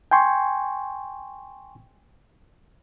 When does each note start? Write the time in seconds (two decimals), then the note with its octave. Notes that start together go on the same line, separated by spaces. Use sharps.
0.11 G5 G#5 C6 C#6